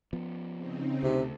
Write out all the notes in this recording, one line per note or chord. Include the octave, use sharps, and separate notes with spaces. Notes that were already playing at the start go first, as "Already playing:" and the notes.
F3 B3
C#3 C4 D#4
D2 C3